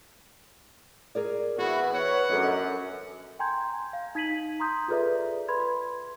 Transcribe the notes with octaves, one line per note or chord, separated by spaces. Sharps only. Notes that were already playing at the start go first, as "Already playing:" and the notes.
G#4 A#4 D5
E3 B3 E4 F#4 G#4
B4 C#5 F#5
F#2 D4 A4 D#5
G5 G#5 A#5 C6 G6 G#6
F5
D#4 G#6 B6 D#7 F#7
A#5 C6 D#6 G6
F4 G#4 A4 B4 D5 E5
B4 B5 C6 G#6